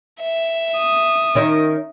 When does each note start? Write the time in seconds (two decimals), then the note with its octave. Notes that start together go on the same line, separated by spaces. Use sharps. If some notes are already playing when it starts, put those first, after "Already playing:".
0.20 E5
0.78 D#6
1.35 D#3 C#4 D#4